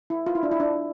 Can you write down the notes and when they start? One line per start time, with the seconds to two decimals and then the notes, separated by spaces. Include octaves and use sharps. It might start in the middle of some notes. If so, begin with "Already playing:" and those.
0.10 E4
0.26 F4
0.35 E4
0.43 D4
0.51 E4
0.60 D4